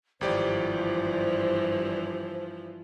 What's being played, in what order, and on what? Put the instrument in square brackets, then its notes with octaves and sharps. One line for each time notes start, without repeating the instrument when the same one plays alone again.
[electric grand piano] G#1 G4 D5 [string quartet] G2 E3 F3 [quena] C5